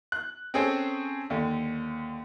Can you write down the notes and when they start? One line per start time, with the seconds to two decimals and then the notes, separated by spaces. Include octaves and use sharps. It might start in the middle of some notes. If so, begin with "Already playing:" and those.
0.12 F#6
0.54 C4 C#4 G#4 A4 C5 C#5
1.30 D#2 D3